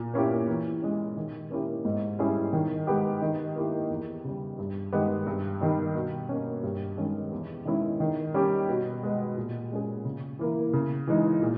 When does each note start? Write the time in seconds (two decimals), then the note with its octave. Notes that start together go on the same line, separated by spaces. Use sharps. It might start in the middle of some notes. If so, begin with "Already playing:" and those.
Already playing: A#2
0.14 A#3 C#4 E4 G4
0.48 E3
0.82 G#3 C#4
1.16 D#3
1.51 A#3 C#4 E4 G4
1.85 G#2
2.19 G3 C#4 E4 G#4
2.53 D#3
2.87 G#3 B3 G4
3.22 D#3
3.56 A#3 E4 G4
3.90 E2
4.24 C#3 G3
4.58 G2
4.93 D#3 G#3 B3 G4
5.26 G2
5.61 D#3 G3
5.95 B2
6.29 A#3 C#4
6.63 G2
6.98 D#3 G#3 C#4
7.32 E2
7.65 D#3 G#3 C#4 E4
8.00 D#3
8.34 G3 C#4 G4
8.69 B2
9.03 G#3 B3
9.37 A#2
9.71 G#3 C#4 G#4
10.05 C#3
10.39 E3 A#3 E4
10.73 C#3
11.07 E3 G#3 D#4
11.42 A#2